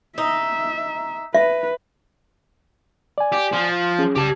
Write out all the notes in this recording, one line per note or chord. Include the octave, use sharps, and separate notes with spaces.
D#4 E5
B4 E5
D5 G#5
G4
F3
C#4 G#4
C2 C#3 G4 A5